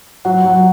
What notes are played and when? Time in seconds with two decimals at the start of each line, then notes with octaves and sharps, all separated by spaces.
0.25 F#3 F#5
0.45 F#3